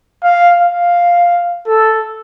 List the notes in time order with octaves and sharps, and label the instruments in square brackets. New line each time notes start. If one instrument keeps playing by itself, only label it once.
[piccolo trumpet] F5
F5
A4